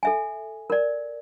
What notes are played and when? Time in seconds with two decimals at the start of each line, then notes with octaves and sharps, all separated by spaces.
0.03 A4 E5 G#5
0.70 A#4 D5